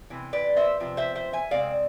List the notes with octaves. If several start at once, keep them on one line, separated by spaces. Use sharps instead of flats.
C3 E3
B4 D5
C5 E5
C3 F3
C5 E5
C5 E5
E5 G#5
C3 G#3 C4 D5 F5